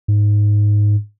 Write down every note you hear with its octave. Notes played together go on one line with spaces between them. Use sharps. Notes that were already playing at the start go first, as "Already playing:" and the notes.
G#2